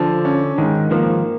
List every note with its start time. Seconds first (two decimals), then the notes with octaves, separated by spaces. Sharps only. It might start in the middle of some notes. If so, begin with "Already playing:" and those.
Already playing: D3 F3
0.25 C#4
0.58 G#2 D#3
0.91 D#3 F3 A#3